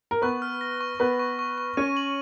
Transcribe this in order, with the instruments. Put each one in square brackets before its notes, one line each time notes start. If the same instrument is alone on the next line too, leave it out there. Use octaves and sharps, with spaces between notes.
[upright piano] A#4
[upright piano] B3 B4 [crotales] C#6
[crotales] F6
A#6
C#6
[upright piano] B3 B4 [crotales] C#6
[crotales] C#6
C#6
C#6
[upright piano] C#4 C#5 [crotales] D#7
[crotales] F#7